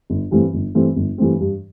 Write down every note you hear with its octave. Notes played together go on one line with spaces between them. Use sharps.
G1
G2 E3 A3 C4
G1
G2 E3 A3 C4
G1
G2 E3 A3 C4
G2